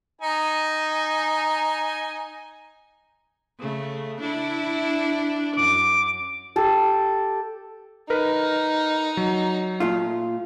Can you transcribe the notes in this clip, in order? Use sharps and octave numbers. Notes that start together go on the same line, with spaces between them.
D#4 G#5
C#3 A3
D4 E4
F#2 D6
G4 A4
D#4 A#4 B4
F#3
A#2 A3 F4